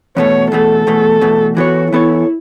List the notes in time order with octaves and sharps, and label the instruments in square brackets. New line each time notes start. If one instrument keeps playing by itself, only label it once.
[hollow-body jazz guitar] E2 B2 A3 [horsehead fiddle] C#5
[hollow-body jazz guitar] E2 B2 A3 [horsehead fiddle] A4
[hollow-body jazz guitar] E2 B2 A3
E2 B2 A3
[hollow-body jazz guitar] E3 B3 A4 C#5 [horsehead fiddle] F#4
[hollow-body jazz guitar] E3 B3 A4 C#5 [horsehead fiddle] E4